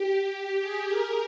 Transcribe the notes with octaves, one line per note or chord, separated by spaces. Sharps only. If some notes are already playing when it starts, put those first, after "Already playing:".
Already playing: G4
G#4
A#4